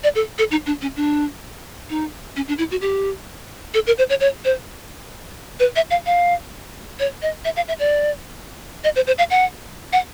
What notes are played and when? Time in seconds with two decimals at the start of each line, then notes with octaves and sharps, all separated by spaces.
0.04 D5
0.15 A4
0.38 A4
0.51 D#4
0.66 D4
0.82 C#4
0.96 D4
1.90 D#4
2.36 C#4
2.48 D4
2.58 E4
2.71 F#4
2.81 G4
3.74 A4
3.87 A#4
3.98 C5
4.10 C#5
4.20 C#5
4.45 C5
5.60 B4
5.76 E5
5.91 F5
6.06 F5
6.99 C#5
7.22 D#5
7.45 E5
7.56 F5
7.68 E5
7.79 D5
8.84 D#5
8.96 C5
9.07 C5
9.18 F5
9.30 F#5
9.93 F#5